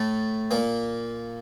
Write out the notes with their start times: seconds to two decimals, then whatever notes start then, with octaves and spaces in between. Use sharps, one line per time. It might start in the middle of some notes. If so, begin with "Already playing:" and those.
Already playing: A2 A3
0.51 A#2 A#3